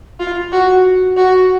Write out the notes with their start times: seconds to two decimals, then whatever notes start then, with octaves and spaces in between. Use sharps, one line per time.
0.19 F4
0.52 F#4
1.17 F#4